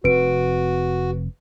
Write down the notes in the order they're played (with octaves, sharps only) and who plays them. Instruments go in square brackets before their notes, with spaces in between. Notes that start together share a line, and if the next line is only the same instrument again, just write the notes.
[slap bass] F1 C4 [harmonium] F#4 [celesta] B4 D7